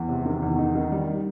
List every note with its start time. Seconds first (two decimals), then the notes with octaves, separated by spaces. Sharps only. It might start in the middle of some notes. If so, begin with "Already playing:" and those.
Already playing: E2
0.09 C3
0.26 D#3
0.43 E2
0.59 D#4
0.75 D#3
0.92 G3